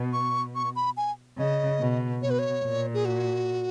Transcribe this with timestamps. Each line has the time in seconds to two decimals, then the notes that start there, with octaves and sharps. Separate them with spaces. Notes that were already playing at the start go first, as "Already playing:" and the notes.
Already playing: B2
0.13 C#6
0.55 C#6
0.76 B5
0.97 G#5
1.38 C#3 D#5
1.80 B2
2.22 B2 C#5
2.30 B4
2.39 C#5
2.65 A#2
2.94 G#4
3.05 F#4